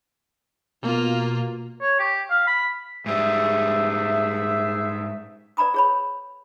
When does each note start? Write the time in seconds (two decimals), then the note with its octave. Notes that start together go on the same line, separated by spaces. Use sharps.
0.82 B2 A#3 F4
1.81 C#5
1.99 G4
2.30 F5
2.47 B5
3.06 G#2 G3 G#4 C5 E5
5.57 B4 D5 A#5 B5 D#6
5.74 G#4 C#5 B5